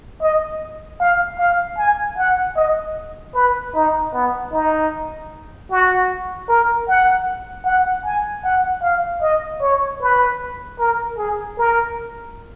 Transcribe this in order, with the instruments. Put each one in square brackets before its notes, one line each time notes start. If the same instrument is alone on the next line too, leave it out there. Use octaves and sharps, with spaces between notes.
[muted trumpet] D#5
F5
F5
G#5
F#5
D#5
B4
D#4
B3
D#4
F#4
A#4
F#5
F#5
G#5
F#5
F5
D#5
C#5
B4
A#4
G#4
A#4